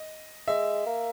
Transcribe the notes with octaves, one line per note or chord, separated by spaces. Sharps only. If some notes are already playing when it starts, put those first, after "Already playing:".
Already playing: D#5
G#3 E5
A#3